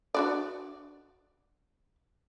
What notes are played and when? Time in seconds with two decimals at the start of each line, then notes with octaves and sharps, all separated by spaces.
0.14 D4 F#4 D5